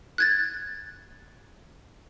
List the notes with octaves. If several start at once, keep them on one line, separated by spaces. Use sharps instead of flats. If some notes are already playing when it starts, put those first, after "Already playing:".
F#6 G#6 A6